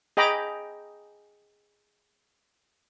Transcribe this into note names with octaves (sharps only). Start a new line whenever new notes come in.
G#4 D#5 G5 A#5 B5 D6